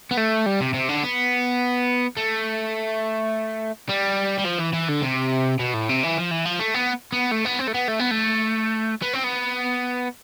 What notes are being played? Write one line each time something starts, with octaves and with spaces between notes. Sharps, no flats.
B3
A3
G3
C3
C3
D3
B3
A3
G3
G3
F3
E3
E3
D3
C3
B2
A2
C3
E3
F3
E3
F3
A3
B3
B3
A3
B3
C4
A3
B3
A3
B3
A3
B3
C4
B3